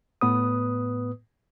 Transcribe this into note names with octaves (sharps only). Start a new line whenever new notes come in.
A2 B3 B4 D#6